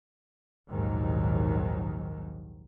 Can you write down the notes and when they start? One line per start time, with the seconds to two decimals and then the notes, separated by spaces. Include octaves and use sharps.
0.70 A#1 D#2 G#2 D#3 F#3